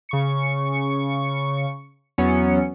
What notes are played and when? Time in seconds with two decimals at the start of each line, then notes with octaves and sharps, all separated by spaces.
0.09 C#3 C#6 C#7
2.18 E2 F#3 B3 C#4 C#7